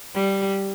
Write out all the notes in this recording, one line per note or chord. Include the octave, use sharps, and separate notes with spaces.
G3